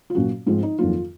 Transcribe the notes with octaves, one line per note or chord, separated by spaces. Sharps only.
F4
A#2 F#3 C#4 F#4
G#2 F3 G#3 C4 F4
D#4
F2 D#3 F#3 A#3 F4